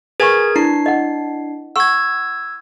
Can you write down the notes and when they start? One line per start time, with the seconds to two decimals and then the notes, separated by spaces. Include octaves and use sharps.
0.20 G#4 A#4 B4 G#5 C#6 G#6
0.56 D4 E4 C7
0.86 D#5 F#5
1.76 F#5 C#6 E6 G#6